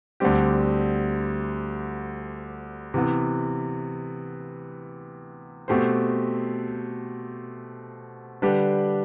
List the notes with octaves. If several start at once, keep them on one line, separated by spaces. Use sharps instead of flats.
D2 D3 G3 C4 G4
C3 E3 B3
B2 A3 C4 G4 C5
D3 G3 D4 G4 B4